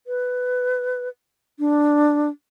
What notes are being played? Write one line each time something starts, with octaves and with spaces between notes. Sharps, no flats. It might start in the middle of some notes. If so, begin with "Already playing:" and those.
B4
D4